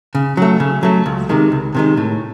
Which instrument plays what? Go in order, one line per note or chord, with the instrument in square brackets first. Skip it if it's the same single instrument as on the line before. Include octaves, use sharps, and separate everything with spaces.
[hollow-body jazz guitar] C#3
F#3 A3
C#3
F#3 A3
C#2
C3 D#3 G#3
C#2
C3 D#3 G#3
A2